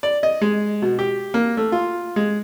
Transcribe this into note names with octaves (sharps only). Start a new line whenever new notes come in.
D5
D#5
G#3
B2
G4
A#3
A3
F4
G#3